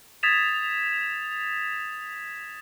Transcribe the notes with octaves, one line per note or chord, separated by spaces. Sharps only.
D#6 G#6 A6 B6 E7 F7